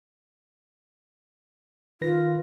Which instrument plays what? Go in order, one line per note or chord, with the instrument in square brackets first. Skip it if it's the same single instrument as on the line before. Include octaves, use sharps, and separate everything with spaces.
[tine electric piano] D#3 B4 A#6 [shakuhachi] F4